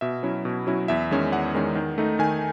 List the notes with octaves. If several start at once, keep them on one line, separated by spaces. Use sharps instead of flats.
B2 E5
F#3 C#4 E4
B2
F#3 C#4 E4
E2 E5
D#3 G#3 C#4
E2 F#5
D#3 G#3 C#4
D#3
A3 D#4
D#3 G#5